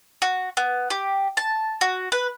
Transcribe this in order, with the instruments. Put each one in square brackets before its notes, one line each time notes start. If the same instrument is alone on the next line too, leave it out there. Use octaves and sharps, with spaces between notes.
[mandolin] F#4
B3
G4
A5
F#4
B4